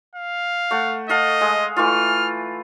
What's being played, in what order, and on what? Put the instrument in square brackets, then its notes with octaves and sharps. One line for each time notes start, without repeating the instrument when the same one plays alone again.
[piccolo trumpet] F5
[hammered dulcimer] A3 F#5
[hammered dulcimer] A4 F5 F#5 [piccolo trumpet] D#5
[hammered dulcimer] G#3
[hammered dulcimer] E3 A3 F4 [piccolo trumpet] F6